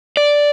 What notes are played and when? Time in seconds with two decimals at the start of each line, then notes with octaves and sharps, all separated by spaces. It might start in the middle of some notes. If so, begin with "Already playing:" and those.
0.17 D5